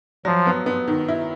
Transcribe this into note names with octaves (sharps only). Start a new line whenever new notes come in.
F3 F#3
B3
B3
D#3
E4